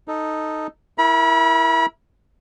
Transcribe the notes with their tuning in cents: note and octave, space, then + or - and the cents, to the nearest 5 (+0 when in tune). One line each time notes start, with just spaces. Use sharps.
D#4 +0 A4 +0
E4 +0 A#4 +0 B5 -35